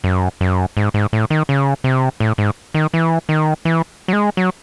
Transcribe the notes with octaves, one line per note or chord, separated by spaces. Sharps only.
F#2
F#2
G#2
G#2
A2
D#3
C#3
C3
A2
G#2
D#3
E3
D#3
E3
F#3
G#3
F#3